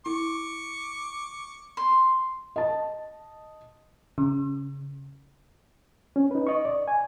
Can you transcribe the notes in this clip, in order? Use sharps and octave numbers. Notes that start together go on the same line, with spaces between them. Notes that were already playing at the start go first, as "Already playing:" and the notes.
E4 C#6 D6
C6
D#5 A5
C#3
C#4
D#4 B4
D#5 C#6
D5
G#5